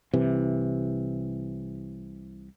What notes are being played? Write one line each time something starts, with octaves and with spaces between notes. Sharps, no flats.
C2 C3 E3